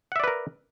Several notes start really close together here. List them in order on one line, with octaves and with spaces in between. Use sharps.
F#5 E5 D5 B4 A#4